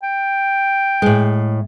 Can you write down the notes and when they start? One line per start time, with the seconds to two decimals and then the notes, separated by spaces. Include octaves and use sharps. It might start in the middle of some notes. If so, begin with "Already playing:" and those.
0.03 G5
1.02 A2 G#3